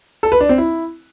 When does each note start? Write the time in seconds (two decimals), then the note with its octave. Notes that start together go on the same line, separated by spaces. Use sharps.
0.23 A4
0.32 B4
0.40 D4
0.49 C4
0.58 E4